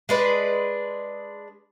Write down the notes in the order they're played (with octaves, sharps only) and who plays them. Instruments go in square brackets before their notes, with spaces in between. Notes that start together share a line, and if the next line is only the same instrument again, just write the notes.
[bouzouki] G#3 D4 B4